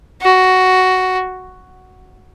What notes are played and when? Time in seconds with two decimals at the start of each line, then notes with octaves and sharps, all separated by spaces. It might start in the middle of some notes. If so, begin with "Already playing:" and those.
0.22 F#4